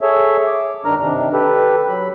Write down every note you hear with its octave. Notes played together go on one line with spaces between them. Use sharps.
G#4 A4 C#5 E5
D6
G2 D#3 D4 A#4 A#5 F6
C3 D#3 D4
G4 A4 B4
F#3 B5